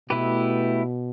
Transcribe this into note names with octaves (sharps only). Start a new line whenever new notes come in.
B2 A3 E4 G4 B4